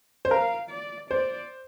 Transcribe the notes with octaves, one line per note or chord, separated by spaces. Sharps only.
C5
A#4 F5
D5
C5 D5